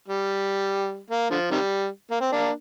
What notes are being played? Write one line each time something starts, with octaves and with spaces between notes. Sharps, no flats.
G3
A#3
D3 F3
C3 D#3 G3
A#3
C4
A#3 D4